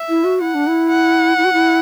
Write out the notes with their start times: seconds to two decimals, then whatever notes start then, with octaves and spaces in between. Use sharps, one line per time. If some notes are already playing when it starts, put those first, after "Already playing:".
Already playing: E5
0.09 E4
0.24 F#4
0.41 E4 F#5
0.55 D4
0.67 E4
0.89 F#5
1.38 E4
1.45 F#4
1.53 E4